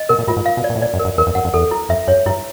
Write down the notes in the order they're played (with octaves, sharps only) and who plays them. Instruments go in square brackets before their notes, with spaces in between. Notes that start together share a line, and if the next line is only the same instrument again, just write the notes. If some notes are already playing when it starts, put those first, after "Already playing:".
Already playing: [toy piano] D#5
[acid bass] B2 [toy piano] A#4
[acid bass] A#2
[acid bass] A2 [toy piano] F4
[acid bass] G#2
[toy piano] F5
[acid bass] B2
[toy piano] D5
[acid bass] A#2
A2
[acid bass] A#2 [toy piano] D5
[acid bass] F#2
[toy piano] A#4
[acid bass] F#2
[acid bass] E2 [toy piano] A#4
[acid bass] F2
[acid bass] F#2 [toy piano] F#5
[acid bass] F2
[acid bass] E2 [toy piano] A4
[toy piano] E4
[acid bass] F2 [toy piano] E5
[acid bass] F#2 [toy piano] C#5
[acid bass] G2 [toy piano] E4